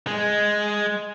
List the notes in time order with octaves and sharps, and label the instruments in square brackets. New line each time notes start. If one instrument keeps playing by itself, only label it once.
[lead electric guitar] G#3 G#4